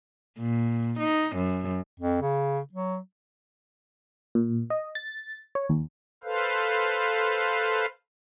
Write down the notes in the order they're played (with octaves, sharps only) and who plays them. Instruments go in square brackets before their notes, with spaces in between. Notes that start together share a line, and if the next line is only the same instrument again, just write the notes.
[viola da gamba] A#2
D#4
F#2
[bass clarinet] F2
C#3
F#3
[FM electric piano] A#2
D#5
A6
C#5
D#2
[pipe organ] A4 B4 C5 F5